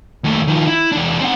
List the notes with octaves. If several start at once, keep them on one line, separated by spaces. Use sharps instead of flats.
D#2 A3
D#3 F3
E4
E2 D4
C4 F#5